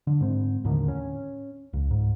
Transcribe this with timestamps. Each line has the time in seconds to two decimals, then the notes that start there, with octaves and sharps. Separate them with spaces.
0.07 D3
0.21 G#2 C4
0.64 D#2 A2 D3 D#3
0.88 C#4
1.73 C#2
1.91 G#2